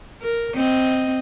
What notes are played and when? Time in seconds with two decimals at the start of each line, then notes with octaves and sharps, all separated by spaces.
0.22 A#4
0.56 C4 D#5